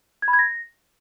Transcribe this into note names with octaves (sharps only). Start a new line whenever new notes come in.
G#6
B5
G#6
A#6